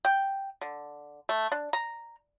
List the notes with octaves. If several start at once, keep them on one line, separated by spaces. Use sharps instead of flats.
G5
D3
A3
D4
A#5